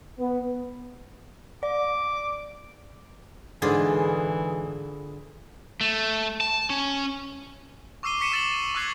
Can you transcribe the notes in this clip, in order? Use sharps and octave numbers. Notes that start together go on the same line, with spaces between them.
B3
D5 D6
G#2 D3 E3 F4 G#4 D5 G#5
A3
A5
C#4
C#6 D6 E6 C7 D#7 G7
C#6 E6 B6 C#7 D#7 E7
D6 E6 A6 C#7 E7 F#7
C#6 E6 F#6 G#6 C7 F#7